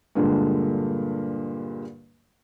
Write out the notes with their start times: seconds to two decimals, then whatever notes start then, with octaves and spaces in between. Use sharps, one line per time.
0.15 G2 A#2 D3 G#3